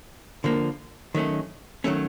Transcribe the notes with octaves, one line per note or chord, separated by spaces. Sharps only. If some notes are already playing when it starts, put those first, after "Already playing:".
D3 F3 A#3
D#3 F#3 A3 C#4
D#3 F#3 A3 C#4